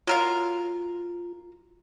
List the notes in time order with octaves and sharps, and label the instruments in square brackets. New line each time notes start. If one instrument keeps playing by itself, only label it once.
[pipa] F#3 A#4 F5 [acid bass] F4